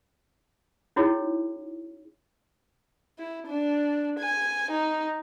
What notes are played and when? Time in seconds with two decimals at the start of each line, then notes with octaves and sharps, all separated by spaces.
0.96 C#4 D#4 E4 F#4 G#4 C#5
3.19 E4
3.47 D4
4.19 G#5
4.71 D#4